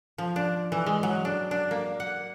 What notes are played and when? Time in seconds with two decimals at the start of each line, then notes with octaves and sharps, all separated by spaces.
0.18 F3
0.36 D4
0.72 E3
0.86 G#3
1.03 F#3
1.25 D4
1.51 D4
1.71 A#3
2.00 F#5